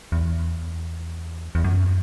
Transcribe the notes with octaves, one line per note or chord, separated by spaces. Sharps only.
E2
E2
F#2